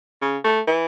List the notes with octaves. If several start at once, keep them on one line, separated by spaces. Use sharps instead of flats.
C#3
A3
E3